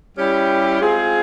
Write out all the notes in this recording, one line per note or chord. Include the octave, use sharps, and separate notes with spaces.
G3 C#4 E4 G4
G#3 C4 F4 G#4